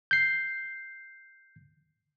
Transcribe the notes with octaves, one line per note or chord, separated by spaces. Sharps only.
G6 C7